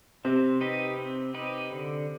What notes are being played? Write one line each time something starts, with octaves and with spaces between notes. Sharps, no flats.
C3 C4
D#4 G4 B4 D#5
C4
D#4 G4 B4 D#5
D3